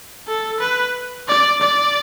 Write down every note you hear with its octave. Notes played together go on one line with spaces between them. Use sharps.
A4
B4
D5
D5